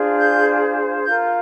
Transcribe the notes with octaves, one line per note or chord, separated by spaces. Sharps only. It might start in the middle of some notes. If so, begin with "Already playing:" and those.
Already playing: D4 F4 G#4 C5
G6
F4 A#4 G6